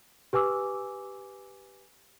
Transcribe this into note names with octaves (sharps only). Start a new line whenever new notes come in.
G4 B4 G#5 D6 E6